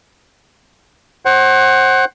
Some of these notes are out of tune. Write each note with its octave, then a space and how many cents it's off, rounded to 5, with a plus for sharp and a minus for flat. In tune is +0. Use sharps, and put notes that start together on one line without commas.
C5 +30 F#5 +25